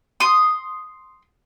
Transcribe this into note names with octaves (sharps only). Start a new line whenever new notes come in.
C6 D#6